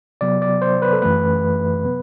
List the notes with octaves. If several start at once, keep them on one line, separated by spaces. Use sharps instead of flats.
C3 F#3 B3 D5
D5
C5
B4
A4
F#2 E3 A3 B4
C3 F#3 B3